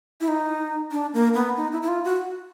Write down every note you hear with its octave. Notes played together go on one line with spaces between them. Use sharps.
E4
D#4
D4
A#3
B3
D#4
E4
E4
F4
F#4